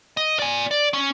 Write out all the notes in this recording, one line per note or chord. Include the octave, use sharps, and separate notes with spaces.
D#5
D5 G#5
D5
C#4